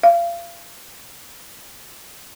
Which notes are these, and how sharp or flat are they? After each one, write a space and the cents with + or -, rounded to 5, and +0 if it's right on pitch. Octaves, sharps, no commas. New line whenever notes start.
F5 -30